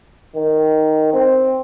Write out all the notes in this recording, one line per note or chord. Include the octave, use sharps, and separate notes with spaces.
D#3
C4